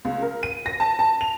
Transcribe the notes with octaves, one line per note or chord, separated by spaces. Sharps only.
C#2
A#4
D#7
A#6
A5
A5
F7